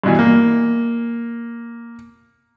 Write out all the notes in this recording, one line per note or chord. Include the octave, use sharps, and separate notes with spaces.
G2 B2 E3
A#3